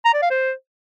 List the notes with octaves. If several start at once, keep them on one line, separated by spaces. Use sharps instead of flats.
A#5
D5
F5
C5